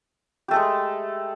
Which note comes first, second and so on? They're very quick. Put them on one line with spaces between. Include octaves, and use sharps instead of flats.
G4 A3 A4 G#3